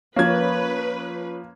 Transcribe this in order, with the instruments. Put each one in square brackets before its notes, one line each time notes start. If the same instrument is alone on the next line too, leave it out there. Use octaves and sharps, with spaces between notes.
[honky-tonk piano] F3 C#4 [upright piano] A#3 G#6 [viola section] B4